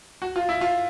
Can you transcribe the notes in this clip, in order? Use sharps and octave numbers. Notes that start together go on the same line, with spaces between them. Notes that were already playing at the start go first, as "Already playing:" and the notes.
F#4
F4
E4
F4